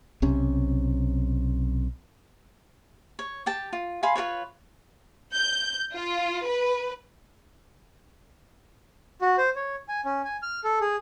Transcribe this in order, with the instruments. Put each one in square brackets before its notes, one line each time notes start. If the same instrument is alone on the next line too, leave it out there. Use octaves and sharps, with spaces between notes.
[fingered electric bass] B1 C3 C#4
[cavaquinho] C#5
G4 G5 A5
F4
F5 G#5 B5 C6
F4 A#4 B4 C#5
[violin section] G6
F4
B4
[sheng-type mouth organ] F#4
C5
C#5
G#5
C#4
G#5
F6
A4
G#4